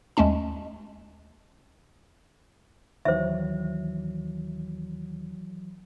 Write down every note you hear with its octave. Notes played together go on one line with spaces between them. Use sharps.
D#2 G#3 A3 C#4 A5
D#2 D#3 E3 F#3 C5 E5